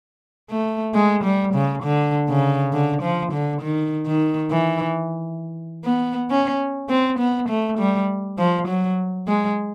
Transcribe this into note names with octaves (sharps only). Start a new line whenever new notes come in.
A3
G#3
G3
C#3
D3
C#3
D3
F3
D3
D#3
D#3
E3
B3
C#4
C4
B3
A3
G3
F3
F#3
G#3